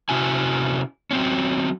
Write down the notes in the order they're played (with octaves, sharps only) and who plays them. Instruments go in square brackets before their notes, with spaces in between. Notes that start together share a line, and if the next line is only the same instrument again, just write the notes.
[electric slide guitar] C3 C#4 E4 F#4 G#5
F#3 C4 C#4